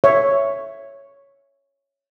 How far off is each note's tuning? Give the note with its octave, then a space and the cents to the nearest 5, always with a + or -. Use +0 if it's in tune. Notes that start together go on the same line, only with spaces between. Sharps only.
C#5 +0 E5 +10